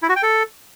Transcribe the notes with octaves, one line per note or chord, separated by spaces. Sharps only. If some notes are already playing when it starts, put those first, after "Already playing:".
E4
F#4
G5
A4